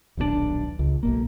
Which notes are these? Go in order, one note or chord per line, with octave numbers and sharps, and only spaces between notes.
D#1 B1 A#2 D4
C#2
B1 E2 A#3